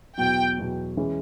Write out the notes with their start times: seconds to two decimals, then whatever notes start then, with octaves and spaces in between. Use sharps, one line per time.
0.18 E2 B2 F#3 G5
0.58 E2 B2 F#3
0.97 E3 G#3 C#4